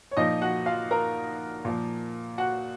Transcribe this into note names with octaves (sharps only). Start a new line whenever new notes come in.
C#5
A#2 F3 D#4 D#5
F#4 F#5
F4 F5
A#4 A#5
A#2 F3
F#4 F#5